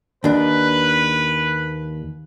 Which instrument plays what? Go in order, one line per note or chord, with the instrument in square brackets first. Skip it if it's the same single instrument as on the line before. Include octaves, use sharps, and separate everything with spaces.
[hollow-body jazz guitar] D#2 D4 [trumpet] B4